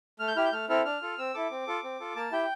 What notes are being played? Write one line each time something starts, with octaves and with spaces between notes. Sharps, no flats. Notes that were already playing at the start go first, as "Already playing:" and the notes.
A3 F6
G6
E4 G4 F6
G6
A3 F6
C4 E4 A4 F6
D4 F6
F4 A4
C4 E6
E4 A4 D6
C4
F4 A4
C4
F4 A4
A#3 A5
E4 G4 G5